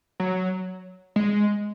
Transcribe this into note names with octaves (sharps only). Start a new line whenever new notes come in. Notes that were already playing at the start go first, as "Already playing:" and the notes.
F#3
G#3